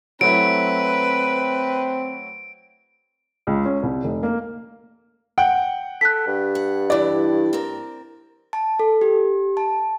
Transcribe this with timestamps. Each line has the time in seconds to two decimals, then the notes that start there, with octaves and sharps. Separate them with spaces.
0.21 F#3 A3 C4 E4 B4 D7
3.47 C#2
3.65 C#4
3.83 C2
4.04 F1
4.23 A#3
5.38 F#5 G5
6.01 A4 F#6 B6
6.27 G2
6.55 F#5
6.90 E3 E4 D5
7.53 C4 A#4
8.53 A5
8.79 A4
9.01 G4
9.57 A5